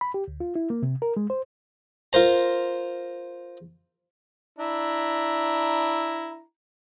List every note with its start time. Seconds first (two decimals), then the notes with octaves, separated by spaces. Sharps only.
0.01 B5
0.14 G4
0.28 D2
0.40 F4
0.56 E4
0.70 A#3
0.83 C3
1.02 A#4
1.17 G#3
1.30 C5
2.13 F4 A#4 C5 A#5
4.59 D4 E4 A#5